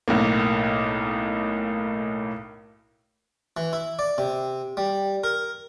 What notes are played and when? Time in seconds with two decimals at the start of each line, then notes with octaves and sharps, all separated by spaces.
0.08 B1 A2 A#3
3.57 E3
3.73 E4
3.99 D5
4.18 C3
4.77 G3
5.24 A#4